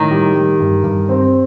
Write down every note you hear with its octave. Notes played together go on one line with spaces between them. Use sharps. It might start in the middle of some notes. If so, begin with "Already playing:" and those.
Already playing: A2 D#3
G3
G3
G2
G2
C4